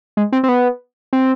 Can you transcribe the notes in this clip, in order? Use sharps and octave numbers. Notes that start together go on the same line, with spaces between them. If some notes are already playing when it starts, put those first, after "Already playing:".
G#3
C4
C4
B3
C4